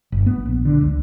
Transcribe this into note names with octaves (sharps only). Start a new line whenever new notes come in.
G1
B3
A#1
D3
C#2